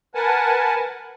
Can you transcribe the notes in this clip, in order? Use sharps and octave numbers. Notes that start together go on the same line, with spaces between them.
A#4 B4 F#5 G#5 A5